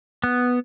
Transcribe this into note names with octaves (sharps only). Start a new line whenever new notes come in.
B3